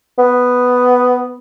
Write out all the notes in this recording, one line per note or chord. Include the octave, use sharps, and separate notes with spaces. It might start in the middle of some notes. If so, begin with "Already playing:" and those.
B3